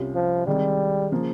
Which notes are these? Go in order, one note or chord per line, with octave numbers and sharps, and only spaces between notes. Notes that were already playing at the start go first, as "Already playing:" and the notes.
Already playing: C2 C3 G3 C#4 F4
F3
C3 D#3 G3 G#3
C#3 F3 A#3